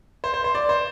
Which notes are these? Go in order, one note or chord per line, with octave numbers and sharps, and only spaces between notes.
C5
C5
C5
D5
C5